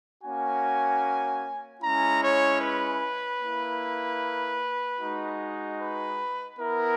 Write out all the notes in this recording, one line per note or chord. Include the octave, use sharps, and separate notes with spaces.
A#3 C#4 F#4 G#5
G#3 C#4 E4 A#5
C#5
B4
A#3 E4
G#3 D#4 F#4
B4
B3 E4 A#4